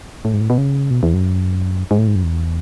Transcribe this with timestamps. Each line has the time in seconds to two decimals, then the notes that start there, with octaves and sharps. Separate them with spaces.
0.25 A2
0.34 G#2
0.41 A2
0.50 B2
0.58 C#3
0.91 B2
1.03 E2
1.14 F#2
1.91 G#2
1.98 A2
2.07 G#2
2.15 F#2
2.23 E2